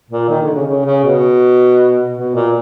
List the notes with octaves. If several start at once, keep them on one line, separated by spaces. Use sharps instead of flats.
A#2
D#3
D3
C#3
C#3
C#3
B2
B2
A#2